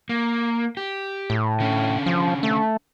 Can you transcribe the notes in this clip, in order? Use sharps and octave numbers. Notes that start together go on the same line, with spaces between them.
A#3
G4
A2
D3 C#4
F3
A3